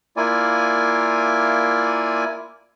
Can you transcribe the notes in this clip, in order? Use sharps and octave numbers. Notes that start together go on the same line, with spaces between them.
A#3 E4 F4 D5 G#5